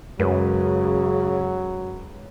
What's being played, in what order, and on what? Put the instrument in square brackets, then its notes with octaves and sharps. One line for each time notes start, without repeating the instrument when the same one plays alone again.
[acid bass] F#2 [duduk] C#3 [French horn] F#3 [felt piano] G#3 B4 C#5